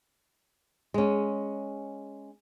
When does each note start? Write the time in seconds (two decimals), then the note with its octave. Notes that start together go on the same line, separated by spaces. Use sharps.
0.94 G#3 C#4